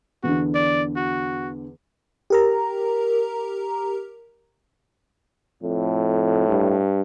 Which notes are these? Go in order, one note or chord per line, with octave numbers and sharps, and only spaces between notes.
E2 D3 F#4
D5
F#4
G4 A#4 A#5
F2 A2
G2